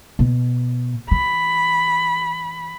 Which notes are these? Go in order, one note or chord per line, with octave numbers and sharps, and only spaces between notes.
B2
E3 B5